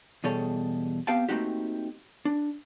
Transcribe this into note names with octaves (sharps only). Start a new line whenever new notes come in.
E2 B2 G3 G#4 A4 C#5
B3 C4 G4 F5 G5 A5
A3 A#3 C4 D#4 F#4 G4
D4